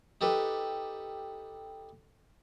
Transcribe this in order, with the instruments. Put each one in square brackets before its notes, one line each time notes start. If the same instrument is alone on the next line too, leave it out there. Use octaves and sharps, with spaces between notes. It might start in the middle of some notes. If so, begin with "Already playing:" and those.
[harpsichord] D#4 G4 A4 B4